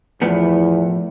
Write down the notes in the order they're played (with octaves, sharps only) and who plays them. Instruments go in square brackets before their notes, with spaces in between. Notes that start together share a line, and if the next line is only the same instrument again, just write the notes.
[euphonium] E2 [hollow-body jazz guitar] A2 F3 B3